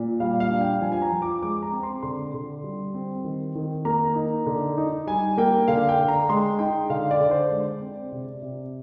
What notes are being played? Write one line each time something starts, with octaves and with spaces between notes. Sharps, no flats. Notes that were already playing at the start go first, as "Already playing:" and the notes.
Already playing: A#2
G3 F5
F5
D4
G5
F3 G#5
G#5
A#5
F3
D6
G#3 D6
A#5
C4
C6
D3 C6
D3
G3
C4
D#3
D#3
A#3 A#5
D#4
D3
D#4
G3 G#5
A#3 G5
D3 F5
G5
D3
A#5
G#3 C6
D#4 G5
D3 F5
D5
D3
C5
G#3 D5
C4
C3
C3